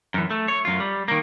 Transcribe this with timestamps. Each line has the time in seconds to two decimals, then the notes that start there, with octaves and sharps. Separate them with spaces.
0.14 F#2 E3
0.31 A3
0.48 C#5
0.65 F#2 F4
0.80 G3
1.08 D#3 A#3